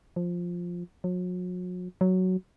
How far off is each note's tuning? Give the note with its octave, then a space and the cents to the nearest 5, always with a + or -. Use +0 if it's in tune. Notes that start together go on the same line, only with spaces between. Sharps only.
F3 +5
F#3 -40
F#3 +5